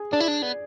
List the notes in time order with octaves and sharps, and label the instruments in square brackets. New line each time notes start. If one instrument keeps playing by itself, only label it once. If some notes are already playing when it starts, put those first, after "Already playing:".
Already playing: [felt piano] G#4
[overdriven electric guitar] D4 [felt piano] D5
[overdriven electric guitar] E4
D4
B3